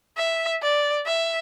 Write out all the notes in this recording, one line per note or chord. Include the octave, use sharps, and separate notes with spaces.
E5
D5
E5